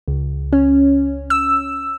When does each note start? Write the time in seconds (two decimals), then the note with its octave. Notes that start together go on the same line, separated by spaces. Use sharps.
0.08 C#2
0.53 C#4
1.30 E6